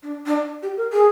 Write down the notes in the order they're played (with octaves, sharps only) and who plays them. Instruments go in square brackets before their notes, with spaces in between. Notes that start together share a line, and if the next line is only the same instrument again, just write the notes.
[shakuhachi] D4
D4
G4
A#4
G#4